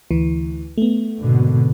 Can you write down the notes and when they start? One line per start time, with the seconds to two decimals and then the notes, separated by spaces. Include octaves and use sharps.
0.11 D2 E3
0.78 A3 B3
1.20 G#1 B2 D3